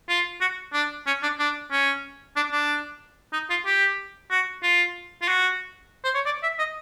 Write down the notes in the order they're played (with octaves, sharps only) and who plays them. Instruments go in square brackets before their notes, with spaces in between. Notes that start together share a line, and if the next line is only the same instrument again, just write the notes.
[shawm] F4
F#4
D4
C#4
D4
D4
C#4
D4
D4
D#4
F4
G4
F#4
F4
F4
F#4
C5
C#5
D5
E5
D#5